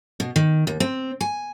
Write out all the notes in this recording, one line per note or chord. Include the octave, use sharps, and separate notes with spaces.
B2
D#3
D#2
C4
G#5